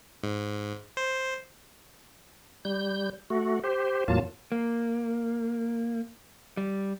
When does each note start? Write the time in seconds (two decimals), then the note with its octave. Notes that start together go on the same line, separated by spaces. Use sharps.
0.23 G#2
0.97 C5
2.65 G3 G6
3.30 A3 F#4
3.64 G4 C5
4.08 E2 A2 F#3 A#3 F4 A5
4.52 A#3
6.57 G3